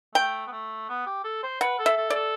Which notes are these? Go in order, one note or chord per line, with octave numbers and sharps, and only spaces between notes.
A3 G5
B3
A3
B3
G4
A4
C5
B4 F#5
A4
E5
A4
D5
A4